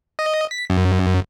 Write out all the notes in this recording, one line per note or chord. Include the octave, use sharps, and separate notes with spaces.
D#5
B6
F#2